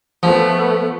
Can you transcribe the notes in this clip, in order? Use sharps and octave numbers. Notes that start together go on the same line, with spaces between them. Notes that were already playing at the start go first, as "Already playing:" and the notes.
F3 A3 B3